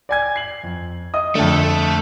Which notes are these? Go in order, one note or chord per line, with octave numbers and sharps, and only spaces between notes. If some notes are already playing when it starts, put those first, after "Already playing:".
D5 G#5 G#6
C7 F#7
F2
D#5 D#6
F2 D3 A3 A4